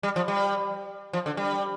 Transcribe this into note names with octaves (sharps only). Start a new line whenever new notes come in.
G3
F3
G3
F3
D3
G3